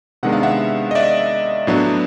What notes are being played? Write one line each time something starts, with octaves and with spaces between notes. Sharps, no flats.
C3 D#3 G#3 B3 D4 F#5
F5
E5 F#5
D#5
D5 E5
A2 F#3 B3 D4